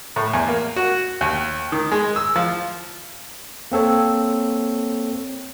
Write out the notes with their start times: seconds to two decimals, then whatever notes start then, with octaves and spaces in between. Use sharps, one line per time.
0.16 A2
0.33 E2
0.49 A#3
0.76 F#4
1.21 D#2
1.72 D#3
1.92 G#3
2.16 E6
2.36 F3
3.72 A#3 C4 A4 C#5